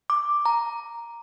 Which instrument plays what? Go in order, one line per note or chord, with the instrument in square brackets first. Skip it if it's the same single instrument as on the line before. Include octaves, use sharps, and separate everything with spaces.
[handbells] D6
A#5